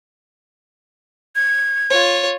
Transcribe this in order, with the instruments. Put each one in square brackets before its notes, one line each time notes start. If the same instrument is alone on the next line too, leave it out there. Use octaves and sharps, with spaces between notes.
[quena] G#6
[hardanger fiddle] F4 C#5